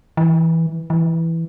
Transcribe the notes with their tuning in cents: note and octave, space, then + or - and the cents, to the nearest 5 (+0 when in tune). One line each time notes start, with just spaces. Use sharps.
E3 -10
E3 +0